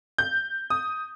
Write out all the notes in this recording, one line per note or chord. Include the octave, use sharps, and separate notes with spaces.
G6
D#6